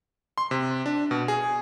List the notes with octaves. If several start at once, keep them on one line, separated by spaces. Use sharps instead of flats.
C6
C3
D4
B2
G#4